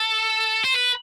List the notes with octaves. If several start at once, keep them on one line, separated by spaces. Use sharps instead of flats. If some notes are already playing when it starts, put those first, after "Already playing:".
Already playing: A4
C5
B4